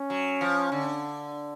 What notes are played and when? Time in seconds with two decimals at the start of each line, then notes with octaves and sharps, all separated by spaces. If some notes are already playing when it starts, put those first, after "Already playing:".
Already playing: C#4
0.10 F#3
0.41 F3
0.72 D3